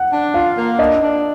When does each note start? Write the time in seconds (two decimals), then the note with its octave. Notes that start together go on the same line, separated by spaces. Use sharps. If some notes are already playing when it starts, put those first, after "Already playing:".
Already playing: F#5
0.12 D4
0.34 F4 F5
0.58 A#3
0.79 D4 D#5
1.02 D4